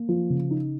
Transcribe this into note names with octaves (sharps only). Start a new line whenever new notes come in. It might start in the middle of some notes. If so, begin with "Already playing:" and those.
Already playing: A#3
F3
C#3
D#4